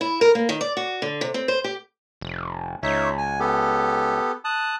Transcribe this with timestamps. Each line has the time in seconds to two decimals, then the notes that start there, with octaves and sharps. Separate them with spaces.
0.01 E4
0.21 A#4
0.35 A#3
0.49 D#3
0.61 D5
0.77 F#4
1.02 D3
1.21 C3
1.34 C4
1.48 C5
1.64 G4
2.21 F1
2.83 C#2 D#4 C#5 E5
3.18 G#5
3.40 B3 G4 A4
4.45 A5 D#6 F#6